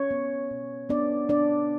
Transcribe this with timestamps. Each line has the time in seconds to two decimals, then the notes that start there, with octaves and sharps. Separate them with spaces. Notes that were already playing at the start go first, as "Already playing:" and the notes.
Already playing: C#4 C#5
0.11 B3
0.51 B2
0.89 B3 D4 D5
1.29 B2 D4 D5